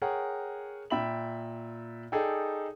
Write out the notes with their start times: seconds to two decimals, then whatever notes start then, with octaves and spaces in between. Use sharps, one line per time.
0.02 G#4 A#4 C#5 F#5 G5
0.90 A#2 E5 G5 B5 F#7
2.12 D#4 G#4 A4 D5 G5